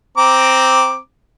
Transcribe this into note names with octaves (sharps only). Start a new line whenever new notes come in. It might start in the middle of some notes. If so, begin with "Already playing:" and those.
C4 A#5 D6